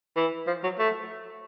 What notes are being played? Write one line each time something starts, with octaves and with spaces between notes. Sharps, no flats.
E3
F3
F#3
A3